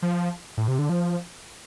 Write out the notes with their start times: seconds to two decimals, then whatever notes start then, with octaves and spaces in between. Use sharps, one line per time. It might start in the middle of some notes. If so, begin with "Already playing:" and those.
0.02 F3
0.57 A2
0.68 C3
0.79 D3
0.89 F3